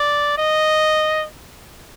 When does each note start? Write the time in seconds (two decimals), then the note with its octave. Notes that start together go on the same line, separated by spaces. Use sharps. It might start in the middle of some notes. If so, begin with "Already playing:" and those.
Already playing: D5
0.38 D#5